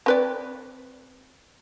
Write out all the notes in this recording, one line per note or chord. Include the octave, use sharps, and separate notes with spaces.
C4 B4 D5